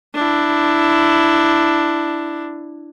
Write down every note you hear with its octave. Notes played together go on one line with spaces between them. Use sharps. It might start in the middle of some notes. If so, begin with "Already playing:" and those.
D4 E4